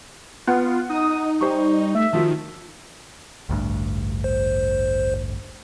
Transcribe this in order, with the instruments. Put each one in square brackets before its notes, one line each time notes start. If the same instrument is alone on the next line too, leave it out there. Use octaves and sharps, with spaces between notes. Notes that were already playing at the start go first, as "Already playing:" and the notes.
[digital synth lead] B3 [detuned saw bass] F4 [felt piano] F#5
[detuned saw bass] D#4 [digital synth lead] D#6
[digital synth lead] G3 [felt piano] C5 C#6
[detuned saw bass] A3 [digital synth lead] E5
[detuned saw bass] D#3 [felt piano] F3 F4 F#4
[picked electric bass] A1 D2 G2
[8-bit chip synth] C5